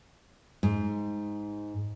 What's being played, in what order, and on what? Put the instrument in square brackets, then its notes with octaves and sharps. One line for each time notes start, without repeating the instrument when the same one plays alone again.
[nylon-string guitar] G#2